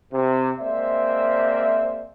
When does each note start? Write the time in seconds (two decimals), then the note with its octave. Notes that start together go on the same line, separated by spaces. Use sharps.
0.13 C3
0.59 G#3 A#3 C4 C5 D5 E5